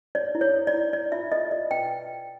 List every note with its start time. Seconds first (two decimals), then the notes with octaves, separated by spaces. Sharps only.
0.15 C#5 D5
0.35 E4
0.41 C#5
0.54 A4
0.67 D5
0.74 E4
0.92 C#5 D5
1.12 F4 E5
1.32 A4 D#5
1.51 F4 D5
1.70 B4 G5